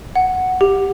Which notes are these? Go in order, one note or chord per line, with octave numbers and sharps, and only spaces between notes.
F#5
G4